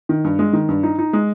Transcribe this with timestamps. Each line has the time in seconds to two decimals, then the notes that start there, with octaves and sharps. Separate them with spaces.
0.09 D#3
0.24 G2
0.39 G#3
0.53 D#3
0.68 G2
0.83 D#4
0.99 D#4
1.13 G#3